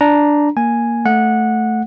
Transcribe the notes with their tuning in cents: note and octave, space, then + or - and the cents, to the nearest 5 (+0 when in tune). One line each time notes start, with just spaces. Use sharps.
D4 +0 A#5 +0
A#3 +0 G#5 +0
A3 +0 F#5 -15